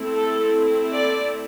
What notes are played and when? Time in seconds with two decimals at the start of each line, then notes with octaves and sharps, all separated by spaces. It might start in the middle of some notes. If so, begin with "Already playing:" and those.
Already playing: A3 C4 E4
0.15 A4
0.93 D5